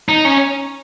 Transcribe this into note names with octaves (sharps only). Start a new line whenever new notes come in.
D#4
C#4